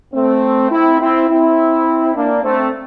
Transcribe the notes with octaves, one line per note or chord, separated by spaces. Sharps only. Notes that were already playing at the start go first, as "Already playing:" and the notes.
A3 C4
C4 E4
C4 E4
C4 E4
A#3 D4
A3 C4